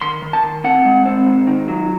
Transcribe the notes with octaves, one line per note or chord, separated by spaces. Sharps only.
D#3 C6
D#3
A5
D#3
C4 F#5
G#3
C4
G#2
D#3
F#3